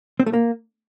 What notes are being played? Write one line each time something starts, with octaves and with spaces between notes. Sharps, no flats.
C4
A3
A#3